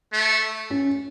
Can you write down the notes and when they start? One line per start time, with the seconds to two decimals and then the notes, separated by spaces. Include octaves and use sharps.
0.13 A3
0.70 C#4